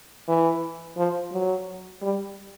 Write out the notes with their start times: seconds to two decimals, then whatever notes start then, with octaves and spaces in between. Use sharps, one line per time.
0.28 E3
0.97 F3
1.33 F#3
2.02 G3